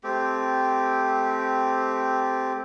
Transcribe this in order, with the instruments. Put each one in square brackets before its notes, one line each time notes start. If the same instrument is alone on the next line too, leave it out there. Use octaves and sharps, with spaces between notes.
[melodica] A3 C4 G4